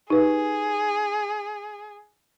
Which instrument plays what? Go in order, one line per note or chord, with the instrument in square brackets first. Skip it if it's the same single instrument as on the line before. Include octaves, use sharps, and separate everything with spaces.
[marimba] D#4 G4 B4 [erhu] G#4